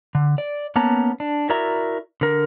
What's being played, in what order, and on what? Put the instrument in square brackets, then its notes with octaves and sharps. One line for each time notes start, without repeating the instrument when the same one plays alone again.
[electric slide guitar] D3
D5
A#3 B3 C#4 A5 A#5
D4
E4 F#4 A#4 D5 E5 A#5
D3 A#4